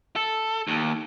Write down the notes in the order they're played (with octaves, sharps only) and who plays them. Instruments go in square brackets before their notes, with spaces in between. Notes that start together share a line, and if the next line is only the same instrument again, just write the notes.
[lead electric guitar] A4
D#2